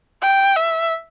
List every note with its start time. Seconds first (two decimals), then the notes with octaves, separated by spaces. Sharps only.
0.22 G5
0.56 E5